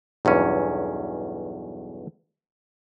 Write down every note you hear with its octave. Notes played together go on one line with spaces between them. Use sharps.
B1 E2 G2 C#4